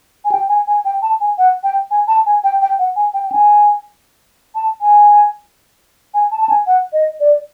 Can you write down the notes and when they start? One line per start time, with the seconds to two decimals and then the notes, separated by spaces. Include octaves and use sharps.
0.25 G#5
0.32 G5
0.49 G#5
0.67 G#5
0.85 G5
1.02 A5
1.21 G#5
1.38 F#5
1.64 G5
1.91 G#5
2.08 A5
2.26 G#5
2.44 G5
2.62 G5
2.79 F#5
2.96 G#5
3.14 G5
3.27 G5
3.32 G#5
4.55 A5
4.81 G#5
6.14 G#5
6.31 A5
6.42 A5
6.49 G#5
6.67 F#5
6.93 D#5
7.20 D5